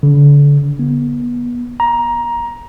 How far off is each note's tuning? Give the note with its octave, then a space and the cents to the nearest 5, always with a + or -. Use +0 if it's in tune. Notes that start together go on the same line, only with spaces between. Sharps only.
D3 -35
B3 -30
A#5 +15